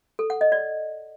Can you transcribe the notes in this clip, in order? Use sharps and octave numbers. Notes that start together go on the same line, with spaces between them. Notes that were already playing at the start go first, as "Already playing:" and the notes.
A4
F#5
D#5
D5